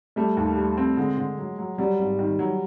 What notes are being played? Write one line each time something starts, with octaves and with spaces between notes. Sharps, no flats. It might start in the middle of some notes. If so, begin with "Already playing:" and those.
G3 A3
D#2
G3
C4
D3 G#3
D3
F#3
F#3
F#3 G3
G#1
D#3
F#3